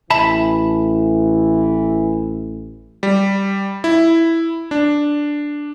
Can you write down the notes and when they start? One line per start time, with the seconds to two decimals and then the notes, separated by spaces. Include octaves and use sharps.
0.10 A1 E3 E5 A5 B5
3.03 G3
3.84 E4
4.71 D4